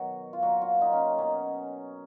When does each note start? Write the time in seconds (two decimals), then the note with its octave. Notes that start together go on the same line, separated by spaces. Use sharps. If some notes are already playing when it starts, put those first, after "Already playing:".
Already playing: B2 D#3 F#3 F#4
0.33 F4
0.43 A#2 F#3 F#4
0.62 F4
0.81 D#4
0.93 C#4
1.18 B2 F#3 C#4